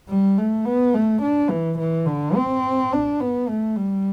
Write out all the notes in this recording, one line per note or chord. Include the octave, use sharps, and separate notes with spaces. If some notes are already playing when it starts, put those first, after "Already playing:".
G3
A3
B3
A3
D4
E3
E3
D3
C4
D4
B3
A3
G3